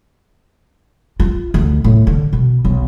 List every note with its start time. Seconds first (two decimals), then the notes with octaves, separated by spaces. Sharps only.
1.20 F4
1.54 D2
1.84 A2
2.07 D3
2.33 B2
2.65 B1